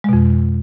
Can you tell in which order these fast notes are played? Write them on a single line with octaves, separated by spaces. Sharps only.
G#3 B2 F2